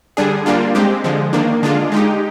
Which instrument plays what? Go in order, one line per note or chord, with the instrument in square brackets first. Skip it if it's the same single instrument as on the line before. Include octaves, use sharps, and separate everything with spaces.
[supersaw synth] D3 G3 D4 G#4
G3 A#3 D4 F4
G#3 C4 G4
D3 F3 G#3
D#3 A#3 D4
D3 G#3 D4 F4
G#3 D#4 G4